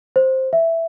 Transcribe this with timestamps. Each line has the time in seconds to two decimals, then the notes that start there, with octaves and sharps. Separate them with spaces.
0.16 C5
0.53 E5